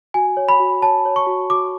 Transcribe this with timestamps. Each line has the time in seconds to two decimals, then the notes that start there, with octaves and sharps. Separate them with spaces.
0.14 F#4 G#5
0.37 C#5
0.49 B5
0.60 F#4
0.82 C#5 A5
1.05 C#5
1.16 C#6
1.27 F#4
1.50 F#4 D6